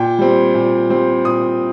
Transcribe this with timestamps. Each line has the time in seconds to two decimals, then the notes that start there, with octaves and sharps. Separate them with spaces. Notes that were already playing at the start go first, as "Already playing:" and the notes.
Already playing: A#2 G5
0.19 G3 C4
0.54 A#2
0.90 G3 C4
1.25 A#2 D#6